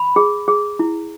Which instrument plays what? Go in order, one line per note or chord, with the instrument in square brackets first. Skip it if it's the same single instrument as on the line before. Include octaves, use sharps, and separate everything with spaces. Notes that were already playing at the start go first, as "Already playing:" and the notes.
Already playing: [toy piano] B5
G#4
G#4
E4